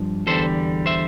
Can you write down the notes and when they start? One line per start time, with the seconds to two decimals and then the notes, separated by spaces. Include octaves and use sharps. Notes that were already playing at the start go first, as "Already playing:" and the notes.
Already playing: G2 F3
0.27 E2 D3 G3 A4 C5
0.86 C5 E5